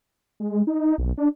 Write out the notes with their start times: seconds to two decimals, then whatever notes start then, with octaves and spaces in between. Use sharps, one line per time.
0.40 G#3
0.67 D#4
0.98 B1
1.17 D4